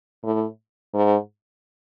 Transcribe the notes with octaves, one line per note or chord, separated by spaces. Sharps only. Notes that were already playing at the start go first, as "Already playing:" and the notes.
A2
G#2